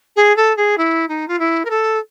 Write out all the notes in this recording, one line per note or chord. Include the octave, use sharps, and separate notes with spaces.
G#4
A4
G#4
E4
D#4
F4
E4
A#4
A4